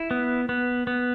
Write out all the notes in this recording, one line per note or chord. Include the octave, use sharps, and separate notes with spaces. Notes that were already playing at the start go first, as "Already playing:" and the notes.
Already playing: E4
B3
B3
B3